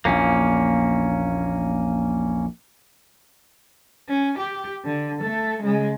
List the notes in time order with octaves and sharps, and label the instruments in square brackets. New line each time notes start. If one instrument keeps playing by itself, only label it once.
[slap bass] A#1 E2 [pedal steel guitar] A#3 C#4
[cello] C#4
G4
D3
A3 A4
C#3 G#3